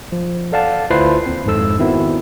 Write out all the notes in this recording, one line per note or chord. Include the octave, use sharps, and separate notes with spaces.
F3
A4 D5 F5 F#5 A5
D2 E4 F4 B4 C5 C7
D#2 C4
G#1 F2 G#2 A4 E6
D#3 B3 C4 E4 F#4